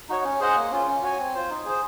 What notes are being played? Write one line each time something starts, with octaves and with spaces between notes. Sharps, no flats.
D#4 F#4 C#5
C#4
G#4 C5 D#5 F#5
A#3
C#4 F4
C#4
F#4 C#5 G#5
C4
F4 C5
D#4
G#4 C5